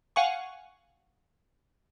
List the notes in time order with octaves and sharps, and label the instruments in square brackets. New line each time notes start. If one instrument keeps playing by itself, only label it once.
[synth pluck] F5 F#5 G#5 C#6